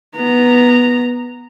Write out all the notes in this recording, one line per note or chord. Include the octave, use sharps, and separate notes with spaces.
B3 A#5